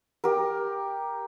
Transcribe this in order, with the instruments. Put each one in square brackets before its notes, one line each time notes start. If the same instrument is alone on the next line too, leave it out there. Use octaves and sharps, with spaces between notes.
[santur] G4 A#4